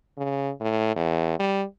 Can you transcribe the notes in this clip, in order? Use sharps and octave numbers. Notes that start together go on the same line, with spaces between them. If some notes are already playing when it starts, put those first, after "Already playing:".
C#3
A2
E2
G3